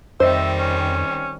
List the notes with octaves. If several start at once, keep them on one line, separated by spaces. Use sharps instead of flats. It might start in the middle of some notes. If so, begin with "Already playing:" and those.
F2 D#3 G3 C4 C5 D#5 E5
C#4